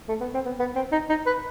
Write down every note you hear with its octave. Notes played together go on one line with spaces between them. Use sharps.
A3
B3
C4
B3
B3
C4
D#4
D#4
B4